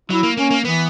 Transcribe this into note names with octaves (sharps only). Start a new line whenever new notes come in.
F#3 E4
A#3
A#3 C#4
A#3
E3 B3